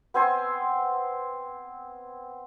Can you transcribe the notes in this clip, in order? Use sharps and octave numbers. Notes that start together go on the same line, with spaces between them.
B3 C4 G#5 C6